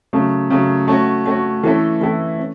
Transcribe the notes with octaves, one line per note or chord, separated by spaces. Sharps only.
C#3 F#3 A3
C#3 F#3 A3
A3 C#4 F#4
A3 C#4 F#4
E3 A3 C#4 E4 A4
E3 A3 C#4 E4 A4
C#4